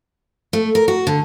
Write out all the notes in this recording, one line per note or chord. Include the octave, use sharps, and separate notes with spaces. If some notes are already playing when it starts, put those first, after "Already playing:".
A3
A#4
F#4
D3